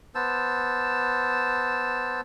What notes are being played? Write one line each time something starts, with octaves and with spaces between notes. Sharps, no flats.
B3 C5 A5 E6